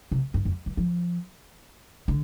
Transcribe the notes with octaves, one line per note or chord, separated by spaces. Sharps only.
C3
G2
F2
G2
F3
D3